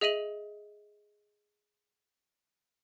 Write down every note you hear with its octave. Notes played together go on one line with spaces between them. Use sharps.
G#4 D#5 E5 D#7 F#7